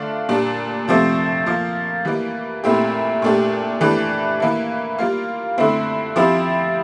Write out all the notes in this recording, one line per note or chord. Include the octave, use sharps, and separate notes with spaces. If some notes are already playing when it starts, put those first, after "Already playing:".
Already playing: D3 A3 D4 F4
A#2 G3 D4
C3 F3 A3 C4
F3 A#3 F4
E3 G3 A#3
A#2 A3 C4 E4 G4
A#2 A3 D4 G4
E3 A3 D4 G4
E3 A#3 E4
G3 A#3 F4
D3 A3 C4 E4
F3 C4 E4 G4